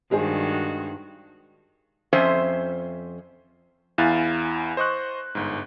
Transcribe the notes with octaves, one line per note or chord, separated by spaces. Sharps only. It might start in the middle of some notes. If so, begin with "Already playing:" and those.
G2 D#3 G#3 F#4 G#4 C5
F2 C#4 C5 E5
E2 E4 F5 G#5 F#6 A6
C5 D#5 C#6 F#6
G1 G#2